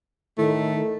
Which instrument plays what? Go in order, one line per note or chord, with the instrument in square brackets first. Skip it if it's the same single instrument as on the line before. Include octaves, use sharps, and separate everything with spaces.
[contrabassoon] A2 [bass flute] D#3 [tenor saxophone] A3